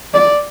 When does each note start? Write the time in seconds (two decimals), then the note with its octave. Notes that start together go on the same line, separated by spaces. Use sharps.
0.14 D5